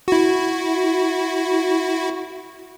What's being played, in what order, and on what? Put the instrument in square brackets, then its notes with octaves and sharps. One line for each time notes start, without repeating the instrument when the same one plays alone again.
[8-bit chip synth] E4 F#4